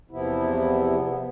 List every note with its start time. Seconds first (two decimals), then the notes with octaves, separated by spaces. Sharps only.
0.11 E2 C3 F3 B3 E4